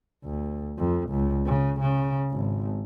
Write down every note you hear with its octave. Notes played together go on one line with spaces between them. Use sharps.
D2
F2
C#2
C#3
C#3
G#1